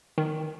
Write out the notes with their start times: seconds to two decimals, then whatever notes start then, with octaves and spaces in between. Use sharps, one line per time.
0.18 D#3